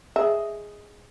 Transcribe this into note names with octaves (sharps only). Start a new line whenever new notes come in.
G#4 D#5 E5